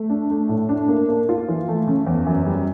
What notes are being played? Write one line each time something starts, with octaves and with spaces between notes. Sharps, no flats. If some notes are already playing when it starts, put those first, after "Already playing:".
Already playing: A3
D4
A3
A2
D4
A#3
A#3
F4
E3
A3
C#3
E2
F#2
G3